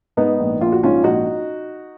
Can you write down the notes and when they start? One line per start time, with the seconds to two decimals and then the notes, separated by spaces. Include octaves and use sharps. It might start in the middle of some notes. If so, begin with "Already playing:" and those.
0.17 G#2 B3 D#4
0.40 A#1
0.61 A#1 F4
0.72 F#4
0.83 G#2 C#4 F4
1.04 A#1 D#4 F#4